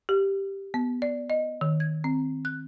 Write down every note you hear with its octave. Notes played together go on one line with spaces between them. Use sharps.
G4
B3
D5
D#5
D#3
G#6
C4
F#6